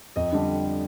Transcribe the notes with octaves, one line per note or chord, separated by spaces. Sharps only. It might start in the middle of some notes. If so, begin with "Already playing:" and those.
F2 D#5
D3 G3 D4